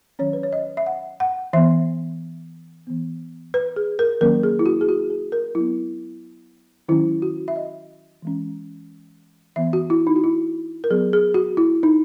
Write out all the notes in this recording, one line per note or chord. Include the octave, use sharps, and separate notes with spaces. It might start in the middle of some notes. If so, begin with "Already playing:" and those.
D#3 F#3 C#4 C#5
B4
C#5
D#5
E5
F#5
F#5
E3 B3 E5
E3 B3
B4
G#4
A#4
D#3 F#3 A#3 C#4 A#4
G#4
E4
F#4
G#4
F#4
G#4
A#4
F#3 B3 E4
D#3 F#3 C#4 E4
F#4
E5
D#5
E3 G#3 C#4
E3 B3 E5
F#4
E4
D#4
F#4
E4
A#4
F#3 B3 G#4
G#4
F#4
E4
D#4